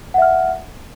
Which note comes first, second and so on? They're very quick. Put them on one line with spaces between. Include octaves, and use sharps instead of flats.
F#5 E5 F6